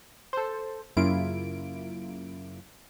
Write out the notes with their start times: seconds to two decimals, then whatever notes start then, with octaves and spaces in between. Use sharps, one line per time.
0.33 A4 C5
0.97 F#2 C#3 A#3 E4 F4 D7